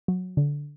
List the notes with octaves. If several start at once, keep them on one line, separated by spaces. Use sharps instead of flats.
F#3
D3